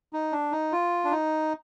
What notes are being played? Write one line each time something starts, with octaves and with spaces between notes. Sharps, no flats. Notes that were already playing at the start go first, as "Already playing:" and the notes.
D#4
D4
D#4
F4
D4
D#4